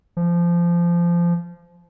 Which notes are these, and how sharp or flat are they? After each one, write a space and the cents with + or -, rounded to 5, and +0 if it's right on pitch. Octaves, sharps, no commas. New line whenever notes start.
F3 -20